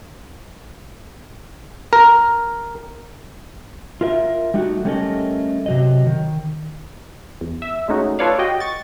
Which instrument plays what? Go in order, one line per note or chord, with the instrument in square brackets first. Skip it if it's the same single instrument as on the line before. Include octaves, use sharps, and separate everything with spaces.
[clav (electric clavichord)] A#4
[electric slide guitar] F4 A#4 E5
G3 A3 D#4 F#4
G3 A3 C#4 A4 A#4 D#5
C3 F#3 D#5
D#3
[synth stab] E2
E5
G#3 A3 C#4 D#4 F#4
F4 A4 B4 C#5 D5 F5
F#4 G4 D#5 G5
C#6 A6